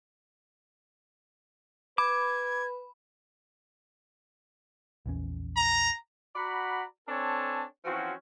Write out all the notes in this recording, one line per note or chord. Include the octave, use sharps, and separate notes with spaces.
B4 B5 D6 G#6
A#1 E2 C#4
A#5
F#4 D5 F#5 A#5 B5
C4 D4 A4 C#5 G#5 A5
E3 F3 C4 C#4 F#4